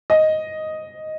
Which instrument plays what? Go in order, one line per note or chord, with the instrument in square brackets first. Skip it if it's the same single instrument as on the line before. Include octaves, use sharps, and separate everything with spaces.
[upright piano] D#5